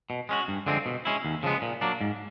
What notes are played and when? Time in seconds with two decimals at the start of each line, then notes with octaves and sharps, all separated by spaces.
0.10 B2
0.29 G#3 C#4 F#4
0.48 G2
0.67 D3 F3 G#3 C4
0.86 B2
1.05 G#3 C#4 E4
1.25 D#2
1.43 C#3 F3 G#3 B3
1.62 A#2
1.81 F#3 A#3 D4
2.01 G#2